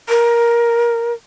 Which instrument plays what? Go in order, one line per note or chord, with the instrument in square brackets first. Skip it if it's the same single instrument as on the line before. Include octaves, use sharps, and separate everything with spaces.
[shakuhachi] A#4